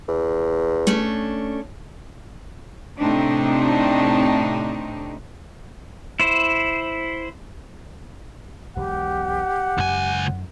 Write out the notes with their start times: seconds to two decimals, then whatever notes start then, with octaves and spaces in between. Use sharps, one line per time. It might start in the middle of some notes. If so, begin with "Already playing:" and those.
0.09 E2
0.87 A3 C#4 D4
2.99 A2 C3 A3 C4 D4 D#4
6.20 E4 C5
8.76 E1 B1 G#3 G4 F#5
9.78 C#2 F#2 G#5